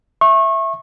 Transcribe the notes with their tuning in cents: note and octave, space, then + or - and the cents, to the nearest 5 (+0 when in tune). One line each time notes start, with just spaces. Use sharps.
E5 +0 C#6 -30